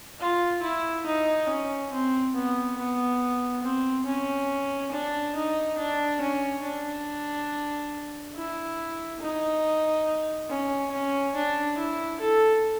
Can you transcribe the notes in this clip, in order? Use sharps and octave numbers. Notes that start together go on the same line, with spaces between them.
F4
E4
D#4
C#4
C4
B3
B3
C4
C#4
D4
D#4
D4
C#4
D4
E4
D#4
C#4
C#4
D4
E4
A4